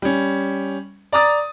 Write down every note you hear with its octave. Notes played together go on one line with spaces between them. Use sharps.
G3 C#4
D5 A#5 D6 D#6 A6